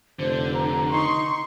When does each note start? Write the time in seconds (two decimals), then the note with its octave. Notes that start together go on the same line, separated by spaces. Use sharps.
0.19 F1 D3 C5
0.54 A#5
0.91 D#4 C6 C#6